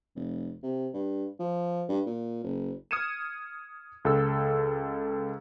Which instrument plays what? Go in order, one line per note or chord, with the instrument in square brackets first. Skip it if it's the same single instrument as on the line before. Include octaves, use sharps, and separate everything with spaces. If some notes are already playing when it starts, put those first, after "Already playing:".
[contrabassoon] F1
C3
G2
F3
G2
A#2
F#1
[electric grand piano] D#6 F6 G#6 C#7 D#7 E7
C#2 A4 E6